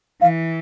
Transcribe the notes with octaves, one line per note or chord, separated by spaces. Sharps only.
E3 F5